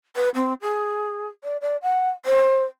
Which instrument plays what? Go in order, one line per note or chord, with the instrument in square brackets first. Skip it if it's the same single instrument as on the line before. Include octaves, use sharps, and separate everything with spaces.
[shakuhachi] B4
C4
G#4
D5
D5
F#5
C5